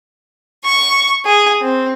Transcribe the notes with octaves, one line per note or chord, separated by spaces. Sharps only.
C#6
G#4
C4